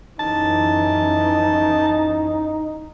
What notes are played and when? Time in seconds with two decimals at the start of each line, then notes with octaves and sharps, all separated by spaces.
0.19 F#2 E3 C#4 D#4 A5